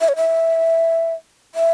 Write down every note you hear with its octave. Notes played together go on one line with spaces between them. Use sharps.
E5
C#5
E5
E5